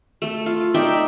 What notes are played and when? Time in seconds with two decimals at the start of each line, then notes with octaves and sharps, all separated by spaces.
0.22 A3 A4
0.46 F4
0.74 D#4 D5 E5 G5